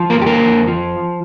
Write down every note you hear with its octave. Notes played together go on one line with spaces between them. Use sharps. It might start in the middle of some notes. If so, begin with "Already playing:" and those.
Already playing: F3
A#3 A#4
F2 G4
A#3 A#4
F2
F3